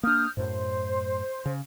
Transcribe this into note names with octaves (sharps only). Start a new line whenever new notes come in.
A#3 D4 D#6 F6 G6
F#2 A2 C5
C#3